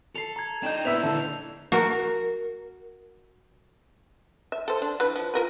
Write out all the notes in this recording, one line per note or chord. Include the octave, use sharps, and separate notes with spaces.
A4 C7 F7
A#5 G#6
D4 D#4 G5 G6 E7
A#2 B3 E4 E5 E6 F7
D3 A5
F#4 A#4
E5
A4 C5
D4
E3 B4
F3
F4 A#4 B4